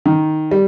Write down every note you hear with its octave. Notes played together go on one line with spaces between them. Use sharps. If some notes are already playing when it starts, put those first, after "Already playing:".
D#3
G3